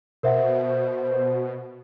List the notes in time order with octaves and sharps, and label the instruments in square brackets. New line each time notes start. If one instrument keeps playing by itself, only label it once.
[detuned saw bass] B2 [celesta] A#4 E5 F#5 [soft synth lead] C5